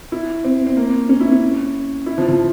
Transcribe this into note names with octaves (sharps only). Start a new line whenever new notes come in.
E4
C4
C4
A#3
C#4
E4
C#4
E4
F3
F3